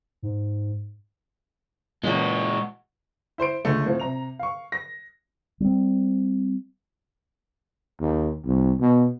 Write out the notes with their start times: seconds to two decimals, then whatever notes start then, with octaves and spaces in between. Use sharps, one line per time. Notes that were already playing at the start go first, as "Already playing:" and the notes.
0.22 G#2
2.03 A#2 C#3 E3 G#3 F#4
3.38 E4 C5 C6 D7
3.65 C#2 D3 A3
3.86 A2 C4 F4
4.00 C3 A#5 F7
4.39 F5 C#6
4.72 A#6
5.60 G3 C4
8.00 D#2
8.45 C2
8.80 B2